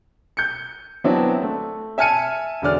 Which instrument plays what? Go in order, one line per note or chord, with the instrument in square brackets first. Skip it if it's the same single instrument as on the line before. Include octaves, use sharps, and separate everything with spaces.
[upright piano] G6 C#7
F#3 B3 C4 D4 E4
A3
E5 G#5 A5 F6 C#7 D#7
E1 D3 D5 F6